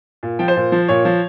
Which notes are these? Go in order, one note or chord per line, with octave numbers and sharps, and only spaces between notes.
A#2
F3 G5
C5
A#2
F3
A#2 C#5
F3